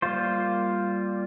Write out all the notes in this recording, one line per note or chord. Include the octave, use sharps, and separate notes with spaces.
G3 A#3 F4 C5